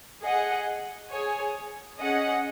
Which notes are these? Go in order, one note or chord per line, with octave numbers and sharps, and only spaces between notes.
G#4 D#5 F#5
G#4 C#5 G#5
C#4 G#4 D#5 F#5